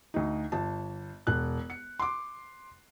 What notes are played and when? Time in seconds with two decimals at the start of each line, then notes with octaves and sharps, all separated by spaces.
0.14 D2 D#4
0.52 G1 A5
1.27 E1 F#6
1.70 C#7
2.00 C6 D6